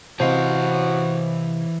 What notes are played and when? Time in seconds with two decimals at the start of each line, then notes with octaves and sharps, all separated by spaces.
0.20 C3 E3 E4 F#4 C5 D#5 F5 A5